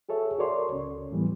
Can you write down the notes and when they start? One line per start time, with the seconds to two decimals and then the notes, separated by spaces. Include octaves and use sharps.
0.09 F#4 G#4 A4 C#5 E5
0.38 F#4 A4 A#4 C#5 D5 C6
0.70 C#2 C#4
1.11 A2 E3 G3 B3